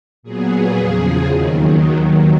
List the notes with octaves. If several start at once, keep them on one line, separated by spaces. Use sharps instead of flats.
A#2 F#3 B3 G#4
E2 C#3 F3
D#2 D#3 F#3